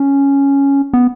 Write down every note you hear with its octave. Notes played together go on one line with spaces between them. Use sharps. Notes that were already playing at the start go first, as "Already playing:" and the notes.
Already playing: C#4
B3